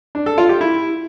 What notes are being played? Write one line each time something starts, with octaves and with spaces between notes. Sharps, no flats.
D4
A4
F4
G4
E4